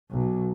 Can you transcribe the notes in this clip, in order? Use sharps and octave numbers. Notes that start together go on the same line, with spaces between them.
B1